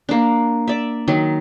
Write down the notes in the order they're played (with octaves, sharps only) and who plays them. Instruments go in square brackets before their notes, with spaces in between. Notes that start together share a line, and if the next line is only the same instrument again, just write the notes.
[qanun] A#3 D4
D5 E5
D#3 F#3